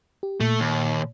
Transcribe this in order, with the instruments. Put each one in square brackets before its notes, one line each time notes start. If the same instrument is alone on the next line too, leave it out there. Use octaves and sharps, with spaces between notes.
[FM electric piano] G4
[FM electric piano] A#2 [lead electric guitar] A3
[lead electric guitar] D#2